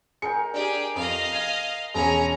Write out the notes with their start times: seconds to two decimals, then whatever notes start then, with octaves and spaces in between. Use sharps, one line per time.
0.22 G#3 A#4 G5 C#7
0.54 D4 G4 G#4
0.95 F2 D#5 F5
1.32 G#6
1.94 E1 G#3 C#4 G#4 A#5